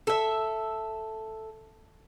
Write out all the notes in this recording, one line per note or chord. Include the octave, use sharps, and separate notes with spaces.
A4 E5